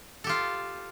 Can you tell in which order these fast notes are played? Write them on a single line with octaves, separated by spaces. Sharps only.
A4 G4 F4